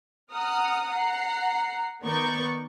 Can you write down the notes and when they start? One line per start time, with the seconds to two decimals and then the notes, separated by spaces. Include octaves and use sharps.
0.32 F#5 A#5 D#6 F6
0.90 F#5 A#5 C7
2.02 D#3 B3 A#4 D5 C#6 G6